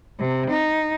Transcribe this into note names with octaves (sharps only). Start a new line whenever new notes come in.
C3
D#4